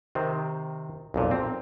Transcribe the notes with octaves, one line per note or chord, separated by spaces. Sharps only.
C3 D#3 C4
B1 F2 A#2
C4